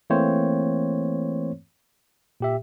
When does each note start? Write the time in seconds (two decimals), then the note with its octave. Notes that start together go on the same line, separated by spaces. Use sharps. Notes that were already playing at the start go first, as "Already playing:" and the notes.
0.10 E3 A3 A#3 C4 C5 C#5
2.40 A#2 G4 E5